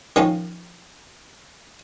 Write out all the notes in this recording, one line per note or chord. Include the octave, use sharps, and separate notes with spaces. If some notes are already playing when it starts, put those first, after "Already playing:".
D#3 F3 C#4 F4